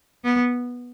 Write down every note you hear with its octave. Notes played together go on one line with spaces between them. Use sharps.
B3